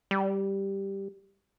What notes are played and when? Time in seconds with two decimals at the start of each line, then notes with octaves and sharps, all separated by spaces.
0.11 G3